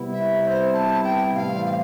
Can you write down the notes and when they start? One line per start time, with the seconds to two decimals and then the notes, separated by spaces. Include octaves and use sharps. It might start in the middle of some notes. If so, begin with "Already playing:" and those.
Already playing: C3 G3 B3 E4
0.12 E5
0.43 E5
0.47 C5
0.73 A5
1.04 G5
1.35 A2 E3 G3 C4 F5
1.65 F5